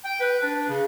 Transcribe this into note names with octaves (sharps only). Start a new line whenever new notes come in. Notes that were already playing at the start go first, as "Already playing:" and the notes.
G5
B4
D4
C#3